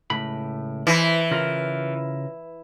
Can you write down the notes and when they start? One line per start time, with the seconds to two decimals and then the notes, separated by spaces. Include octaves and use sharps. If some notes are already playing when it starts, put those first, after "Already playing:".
0.10 C#2 A2 B5
0.87 E3 E4 C5
1.31 C#3 F4 A#4